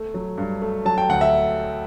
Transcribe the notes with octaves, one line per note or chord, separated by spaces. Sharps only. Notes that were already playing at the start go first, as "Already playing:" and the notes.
Already playing: A3
F#3
G2
A3
F#3 A5
G5
D2 F#5
E5